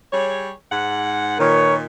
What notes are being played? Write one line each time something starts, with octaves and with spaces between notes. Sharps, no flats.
G3 G#4 C#5
G#2 F#5
A#2 D#3 A#4 B4 C#5